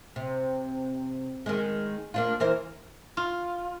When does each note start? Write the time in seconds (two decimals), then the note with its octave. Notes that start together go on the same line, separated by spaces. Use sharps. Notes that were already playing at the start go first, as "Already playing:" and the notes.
0.16 C3
1.46 D#3 G#3
2.14 A#3 D4 F4
2.40 E3 A#4 C5
3.17 F4